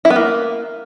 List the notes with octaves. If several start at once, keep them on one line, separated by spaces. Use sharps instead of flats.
E4
B3
A#3